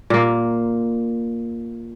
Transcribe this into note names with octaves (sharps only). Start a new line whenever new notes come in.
A#2 A#3